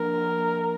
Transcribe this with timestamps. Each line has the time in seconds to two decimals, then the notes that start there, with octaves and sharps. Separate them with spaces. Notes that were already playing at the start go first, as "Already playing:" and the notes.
Already playing: F3 A#3 D4 A#4
0.11 F3
0.38 A#3